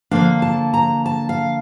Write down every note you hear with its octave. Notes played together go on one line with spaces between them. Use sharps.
D3 F3 A#3 D4 F5
A5
A#5
A5
F5